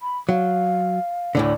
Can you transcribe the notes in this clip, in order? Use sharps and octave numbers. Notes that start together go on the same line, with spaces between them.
B5
F#3 F5
D2 A2 D3